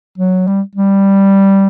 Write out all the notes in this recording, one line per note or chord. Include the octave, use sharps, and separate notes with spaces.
F#3
G3
G3